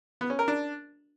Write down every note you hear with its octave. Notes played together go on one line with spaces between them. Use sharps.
B3
C#4
A#4
D4